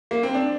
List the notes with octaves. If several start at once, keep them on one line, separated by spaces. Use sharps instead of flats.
A#3
C4
D4